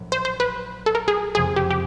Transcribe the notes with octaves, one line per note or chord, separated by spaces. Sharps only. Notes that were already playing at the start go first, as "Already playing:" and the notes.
Already playing: A#1 A2 F#3
C5
C5
B4
A4
A#4
G#4
F#1 F2 C3 F3 G#3 G#4
G4
G4